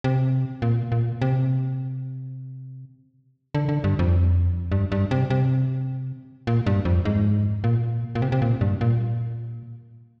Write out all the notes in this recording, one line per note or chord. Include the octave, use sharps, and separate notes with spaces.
C3
A#2
A#2
C3
D3
D3
G2
F2
G2
G2
C3
C3
A#2
G2
F2
G#2
A#2
A#2
C3
C3
A#2
G2
A#2